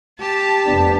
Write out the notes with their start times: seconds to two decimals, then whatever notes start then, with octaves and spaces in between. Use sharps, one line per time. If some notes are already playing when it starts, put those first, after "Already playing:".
0.21 G4 A5
0.66 F1 B3 D4